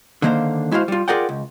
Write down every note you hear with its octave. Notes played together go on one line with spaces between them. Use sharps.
D3 D#3 A#3 C5 F5
G#3 E4 F#4 C5 F5
G3 F4
F4 G#4 A#4 D5 F#5 G5
C#2